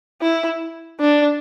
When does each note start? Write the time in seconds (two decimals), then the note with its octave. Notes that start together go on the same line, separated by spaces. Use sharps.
0.21 E4
1.00 D4